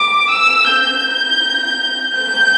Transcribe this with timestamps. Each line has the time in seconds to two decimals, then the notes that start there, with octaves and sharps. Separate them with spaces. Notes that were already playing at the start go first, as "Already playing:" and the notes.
Already playing: D6
0.30 E6
0.67 G6
2.15 G6